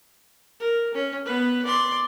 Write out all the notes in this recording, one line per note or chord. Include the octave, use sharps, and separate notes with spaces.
A#4
C#4
B3 B4
D5 C6